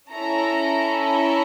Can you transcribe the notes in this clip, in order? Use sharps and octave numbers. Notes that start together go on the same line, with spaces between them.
C#4 E4 A4 A#5
A#5